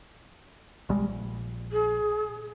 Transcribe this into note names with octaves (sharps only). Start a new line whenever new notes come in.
B1 G3 G#3
A#1
G#4